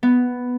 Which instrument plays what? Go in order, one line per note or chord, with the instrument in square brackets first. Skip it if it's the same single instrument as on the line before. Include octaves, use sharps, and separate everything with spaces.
[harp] B3